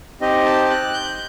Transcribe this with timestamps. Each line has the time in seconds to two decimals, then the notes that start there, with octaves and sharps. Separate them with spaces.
0.21 C4 D#4 G4 D#5
0.46 A5
0.70 F#6
0.93 G6